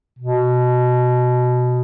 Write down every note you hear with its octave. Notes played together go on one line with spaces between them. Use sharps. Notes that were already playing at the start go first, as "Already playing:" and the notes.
B2